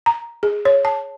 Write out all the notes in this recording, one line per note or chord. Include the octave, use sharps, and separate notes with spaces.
A#5
G#4
C#5
A5